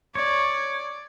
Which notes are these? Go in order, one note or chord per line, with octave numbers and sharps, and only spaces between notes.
C#5 D5